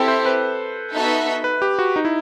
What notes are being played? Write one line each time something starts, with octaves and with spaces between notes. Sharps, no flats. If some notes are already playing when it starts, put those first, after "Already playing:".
Already playing: C4 E4 G4 A4
C5
B4
B3 D#4 F#4 A4 E5
B4
G4
F#4
D#4
E4